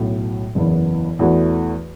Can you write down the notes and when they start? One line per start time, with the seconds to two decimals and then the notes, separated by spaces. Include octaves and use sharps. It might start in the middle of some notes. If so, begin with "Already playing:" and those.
Already playing: B1 A2 F#3
0.55 F#1 E2 E3 B3
1.19 E2 E3 A3 F#4